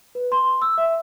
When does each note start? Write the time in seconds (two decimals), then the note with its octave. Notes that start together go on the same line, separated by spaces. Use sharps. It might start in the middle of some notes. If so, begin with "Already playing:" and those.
0.15 B4
0.32 C6
0.62 E6
0.78 E5